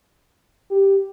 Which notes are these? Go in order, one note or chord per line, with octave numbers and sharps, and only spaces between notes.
G4